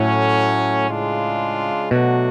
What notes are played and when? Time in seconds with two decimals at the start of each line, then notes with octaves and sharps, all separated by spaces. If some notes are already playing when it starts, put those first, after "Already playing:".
Already playing: A2 F#3 A3 C#4
0.88 C#3 G#3 D4 F4
1.91 B2 F#3 A3 D4 F#4